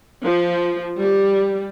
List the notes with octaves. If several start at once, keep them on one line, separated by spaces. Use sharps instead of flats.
F3
G3